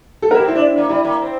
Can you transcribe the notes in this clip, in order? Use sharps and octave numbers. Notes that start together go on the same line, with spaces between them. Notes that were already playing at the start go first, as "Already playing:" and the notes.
A4
A#4
E4
G4
C4
E4
D4
A#3
G3 E4
A#3
C4